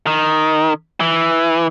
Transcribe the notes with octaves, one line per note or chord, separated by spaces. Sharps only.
D#3
E3